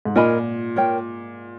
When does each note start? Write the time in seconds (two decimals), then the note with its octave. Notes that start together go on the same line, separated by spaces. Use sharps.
0.05 G#2
0.15 A#2 A#4 D#5 G#5 B5
0.76 A#4 C#5 G5